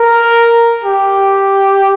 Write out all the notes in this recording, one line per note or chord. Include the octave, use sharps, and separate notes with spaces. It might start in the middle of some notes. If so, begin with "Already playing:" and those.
Already playing: A#4
G4